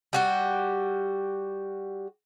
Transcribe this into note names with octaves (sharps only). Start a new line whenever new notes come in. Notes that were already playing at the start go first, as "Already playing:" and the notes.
G3 F#4 G4